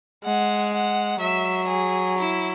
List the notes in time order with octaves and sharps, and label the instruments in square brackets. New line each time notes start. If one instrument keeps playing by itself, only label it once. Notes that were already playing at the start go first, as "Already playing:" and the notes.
[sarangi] G#3 [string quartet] F#5
[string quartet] F#5
[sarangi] F#3 [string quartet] E5
[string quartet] G#4
E4